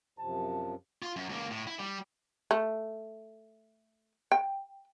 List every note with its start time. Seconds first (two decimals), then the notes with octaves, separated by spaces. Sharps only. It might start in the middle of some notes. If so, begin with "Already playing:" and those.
0.19 F#2 C3 F3 A5
1.02 F4
1.16 F#2
1.29 C#2 A#3
1.51 A2
1.67 E4
1.79 G3
2.51 A3
4.32 G5